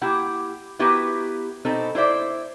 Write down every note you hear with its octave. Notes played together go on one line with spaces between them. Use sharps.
A#3 E4 G4 F#5
B3 E4 F#4 G4 A#4 B4
B2 C4 D#4 A4
E4 C5 D5 E5